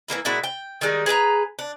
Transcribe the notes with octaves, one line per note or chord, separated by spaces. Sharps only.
E3 G3 A#3 E4
A#2 G#3 E4 F#4
G5
D#3 G3 G#3 D#4
G#4 B4 A5 A#5
D4